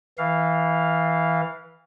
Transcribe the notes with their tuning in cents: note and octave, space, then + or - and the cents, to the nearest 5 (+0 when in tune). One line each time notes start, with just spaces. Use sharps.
E3 -15 F5 +0